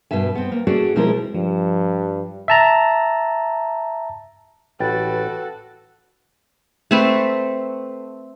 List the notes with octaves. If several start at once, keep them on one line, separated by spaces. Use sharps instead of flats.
G2 B2 B4 E5 G#5
B3 C4
A#3
A3 C#4 F#4 G#4 D5
B2 F3 G#3 C4 E4 A#4
G2 F3
E5 A5 A#5
A1 F#4 A4 B4 G5 A6
A3 C4 B4